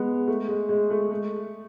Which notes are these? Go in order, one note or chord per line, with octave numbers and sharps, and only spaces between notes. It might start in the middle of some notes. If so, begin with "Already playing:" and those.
Already playing: G#3 B3
A3
G#3
G#3
A3
A3